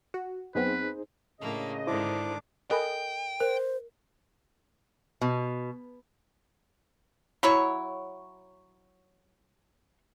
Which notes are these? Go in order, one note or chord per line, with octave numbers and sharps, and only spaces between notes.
F#4
F#2 B3 C4 D#4 G#4 B4 C5
A2 C#3 A#3 D4 D#5
G#2 D3 D#3 D4 E4 C5 D6
A4 A#4 D#5 G5 G#5 B5
A#4 C5
B2
F#3 E4 C#5